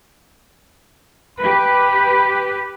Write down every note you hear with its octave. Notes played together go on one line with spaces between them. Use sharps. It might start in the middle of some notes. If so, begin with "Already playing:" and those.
G4 B4 B5